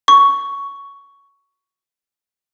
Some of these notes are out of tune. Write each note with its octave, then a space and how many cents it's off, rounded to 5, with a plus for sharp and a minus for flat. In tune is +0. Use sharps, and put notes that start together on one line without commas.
C#6 +10